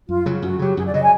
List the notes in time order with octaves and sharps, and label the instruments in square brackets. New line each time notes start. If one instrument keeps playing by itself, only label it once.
[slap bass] F#2 [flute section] F4
[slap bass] C#3 F#3
[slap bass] F#2 [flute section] F#4
[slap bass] C#3 F#3 [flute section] G4
[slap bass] F#2 [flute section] G#4
[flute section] D5
[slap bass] C#3 F#3 [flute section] D#5
[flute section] G#5